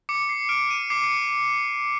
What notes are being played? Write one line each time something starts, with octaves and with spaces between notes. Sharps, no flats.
D6 C#7
C7
F6 D7
D#7
D6 C7
C#7